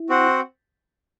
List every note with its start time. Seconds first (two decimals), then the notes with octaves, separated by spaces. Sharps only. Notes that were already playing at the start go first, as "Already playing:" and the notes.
Already playing: E4
0.09 C4 F#4 C5 F#5